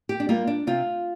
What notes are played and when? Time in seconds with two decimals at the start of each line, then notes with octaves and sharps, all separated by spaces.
0.09 G4
0.20 D4
0.29 G3 A#3 F4
0.47 D4
0.67 C3 F4